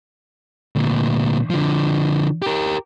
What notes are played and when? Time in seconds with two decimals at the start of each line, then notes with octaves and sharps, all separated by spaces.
0.76 D2 A#2
1.50 D3 F3
2.42 G4 A#4